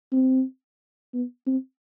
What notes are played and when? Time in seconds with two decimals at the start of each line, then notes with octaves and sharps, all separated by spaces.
0.12 C4
1.14 B3
1.47 C4